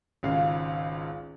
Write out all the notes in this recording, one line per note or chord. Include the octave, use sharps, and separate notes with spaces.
G#1 C#2 F5